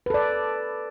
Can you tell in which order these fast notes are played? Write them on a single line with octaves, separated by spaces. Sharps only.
B4 A4 D5